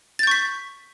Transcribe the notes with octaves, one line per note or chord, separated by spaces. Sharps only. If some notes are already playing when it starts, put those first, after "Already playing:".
C#6 G6 A6 B6